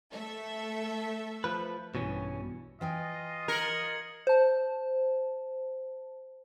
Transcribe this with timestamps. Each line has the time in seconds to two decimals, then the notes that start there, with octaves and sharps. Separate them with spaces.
0.13 A3 A4 E5
1.44 F3 B4
1.95 A#1 G2 B2 E3 C#4
2.81 E3 F4 D#5 G5 G#5
3.48 A#4 G#6 C#7 F#7
4.27 C5 A5